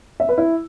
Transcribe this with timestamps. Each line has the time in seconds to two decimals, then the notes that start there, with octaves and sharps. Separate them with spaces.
0.20 E5
0.29 B4
0.38 E4